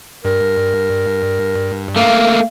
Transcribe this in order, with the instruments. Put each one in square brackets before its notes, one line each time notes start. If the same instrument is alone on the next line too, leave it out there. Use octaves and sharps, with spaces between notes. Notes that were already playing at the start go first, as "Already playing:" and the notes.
[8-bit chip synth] G2 [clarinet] A#4
[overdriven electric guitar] A3 A#3 [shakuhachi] F5